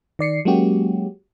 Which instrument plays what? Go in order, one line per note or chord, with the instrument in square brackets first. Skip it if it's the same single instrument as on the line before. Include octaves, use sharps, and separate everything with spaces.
[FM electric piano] D#3 D5 C7 C#7
F#3 G#3 A#3 C#4 F#4 G4